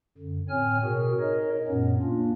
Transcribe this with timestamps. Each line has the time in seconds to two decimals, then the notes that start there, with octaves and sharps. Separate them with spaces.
0.18 F#2 D3
0.49 A2 C4 C#5 G#5 F6
0.84 B2 F#4 G#4 A#4
1.20 D#4 A#4 C#5 D#5
1.68 F#2 A#2 B3 C#4
2.02 A#3 D4 F4